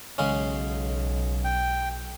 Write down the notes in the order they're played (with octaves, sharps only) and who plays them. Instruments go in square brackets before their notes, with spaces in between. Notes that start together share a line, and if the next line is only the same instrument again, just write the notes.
[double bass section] B1 [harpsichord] C#3 G#3 C#4
[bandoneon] G5